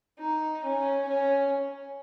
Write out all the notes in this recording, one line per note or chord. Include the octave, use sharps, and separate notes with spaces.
D#4
C#4
C#4